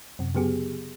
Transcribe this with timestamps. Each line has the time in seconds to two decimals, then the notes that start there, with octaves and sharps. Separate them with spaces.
0.19 F#2 C3
0.35 C#3 F#3 B3 G4 G#4